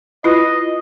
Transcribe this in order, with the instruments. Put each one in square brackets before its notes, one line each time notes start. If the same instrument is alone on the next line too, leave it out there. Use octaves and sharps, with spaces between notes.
[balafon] E4 F4 B4 [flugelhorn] D#5